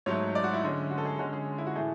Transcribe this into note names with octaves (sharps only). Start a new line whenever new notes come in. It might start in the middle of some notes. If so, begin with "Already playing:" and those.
G#2 F#3 A3 C#5
D5
F#4
E4
D3 G#3 C#4
F#4
A4
G#4
D3 G#3 C#4 F#4
G#4
E4
F#4
A2 E3 A3 G#4